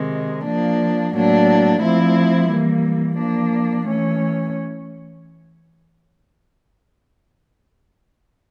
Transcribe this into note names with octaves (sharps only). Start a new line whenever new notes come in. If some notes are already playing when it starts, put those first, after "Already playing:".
Already playing: C3 D#3 G#3
F3 A#3 D4
A2 F#3 A#3 D4
F3 A3 C4 E4
E3 G3 A#3
F3 A#3 D4
E3 A3 C#4